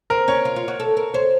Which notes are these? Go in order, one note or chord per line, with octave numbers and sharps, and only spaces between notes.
C4 A#4
C#4 C#5
F4
F4
F#4
A4
A#4
C5 C#5